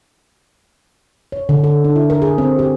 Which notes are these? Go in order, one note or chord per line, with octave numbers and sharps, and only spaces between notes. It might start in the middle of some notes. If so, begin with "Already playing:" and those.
C#5
D3
A4
D4
E4
A#4
G#4
C4
G4